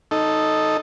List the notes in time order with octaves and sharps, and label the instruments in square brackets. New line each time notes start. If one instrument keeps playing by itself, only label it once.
[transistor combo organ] D#4 A4